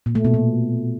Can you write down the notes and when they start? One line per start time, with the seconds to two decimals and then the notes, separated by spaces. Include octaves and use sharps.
0.06 A#2
0.15 A3
0.25 B2
0.34 A#2